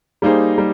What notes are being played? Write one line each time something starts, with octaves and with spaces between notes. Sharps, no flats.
G3 A#3 D#4 G#4 C5
G3